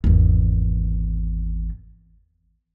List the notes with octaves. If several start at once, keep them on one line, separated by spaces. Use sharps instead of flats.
G#1 E2